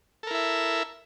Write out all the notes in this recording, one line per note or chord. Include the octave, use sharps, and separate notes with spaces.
E4 A4 A#4 E5